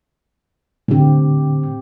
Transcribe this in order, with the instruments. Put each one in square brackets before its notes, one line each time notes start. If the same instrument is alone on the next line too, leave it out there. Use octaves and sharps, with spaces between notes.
[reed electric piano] A2 D3 [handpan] C4 G4